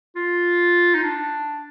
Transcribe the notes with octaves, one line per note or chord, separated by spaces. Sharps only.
F4
D#4
D4